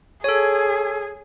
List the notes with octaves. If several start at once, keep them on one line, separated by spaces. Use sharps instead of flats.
G#4 A4 C#5